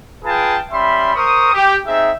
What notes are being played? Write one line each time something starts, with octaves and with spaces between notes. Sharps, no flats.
F4 G#4 B4 G5 A5
G3 C#4 E5 B5 C6
A#4 C5 C#6 D#6
G4
C4 D#4 G#4 E5